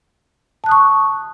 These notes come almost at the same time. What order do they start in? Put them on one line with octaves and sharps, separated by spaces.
A5 F#6 D#6 C#6